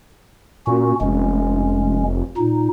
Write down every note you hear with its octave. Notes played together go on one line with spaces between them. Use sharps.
A#2 C#4 F#4
F1 G#3 C#4
A#2 D#4